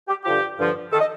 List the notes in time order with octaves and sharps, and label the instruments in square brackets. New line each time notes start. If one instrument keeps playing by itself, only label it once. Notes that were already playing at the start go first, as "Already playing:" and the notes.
[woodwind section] G4
G2 D3 F3 G4
G2 D3 F3
D#3 A4
D#5